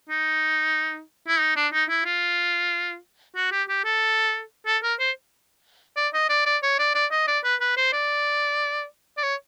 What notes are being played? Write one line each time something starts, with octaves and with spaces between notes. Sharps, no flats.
D#4
E4
D#4
D4
D#4
E4
F4
F#4
G4
G4
A4
A4
A#4
C5
D5
D#5
D5
D5
C#5
D5
D5
D#5
D5
B4
B4
C5
D5
D5
C#5